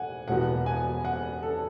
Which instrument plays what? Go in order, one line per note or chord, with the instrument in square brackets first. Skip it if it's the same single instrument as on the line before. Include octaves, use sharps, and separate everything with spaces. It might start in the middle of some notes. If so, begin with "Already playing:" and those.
Already playing: [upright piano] E1 F#5 G#5
E1 E2 B2 F#5
G#5
F#5
A4